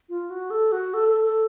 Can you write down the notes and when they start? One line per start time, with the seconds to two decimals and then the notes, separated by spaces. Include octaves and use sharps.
0.09 F4
0.30 F#4
0.50 A4
0.72 F#4
0.94 A4
1.09 A4
1.24 A4